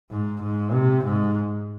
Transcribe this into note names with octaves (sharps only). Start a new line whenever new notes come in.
G#2
G#2
C3
G#2